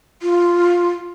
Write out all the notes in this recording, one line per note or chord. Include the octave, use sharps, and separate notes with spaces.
F4